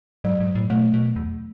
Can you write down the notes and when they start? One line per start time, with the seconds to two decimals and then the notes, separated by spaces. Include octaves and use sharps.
0.24 G#2 F#3
0.40 G#2
0.55 A2
0.70 B2 A3
0.94 B2
1.16 E2